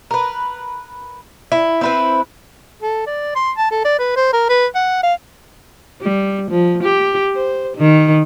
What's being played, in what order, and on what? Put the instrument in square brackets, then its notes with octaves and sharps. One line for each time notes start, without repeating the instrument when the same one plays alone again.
[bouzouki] A#4 B4
E4
C4 E4 B4
[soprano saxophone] A4
D5
C6
A5
A4
D5
B4
C5
A#4
B4
F#5
F5
[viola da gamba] G3
F3
G4
C5
D#3